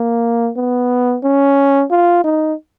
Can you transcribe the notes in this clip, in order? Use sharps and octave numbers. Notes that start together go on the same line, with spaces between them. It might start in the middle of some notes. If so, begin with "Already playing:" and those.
Already playing: A#3
B3
C#4
F4
D#4